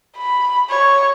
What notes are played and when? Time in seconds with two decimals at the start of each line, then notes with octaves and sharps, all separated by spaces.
0.17 B5
0.70 C#5